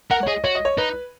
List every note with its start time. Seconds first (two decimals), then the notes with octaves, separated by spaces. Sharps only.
0.11 A#4 F#5
0.23 C#5
0.27 G#4 D#5
0.44 F#4 C#5
0.55 D#5
0.65 C#5
0.78 D#4 B4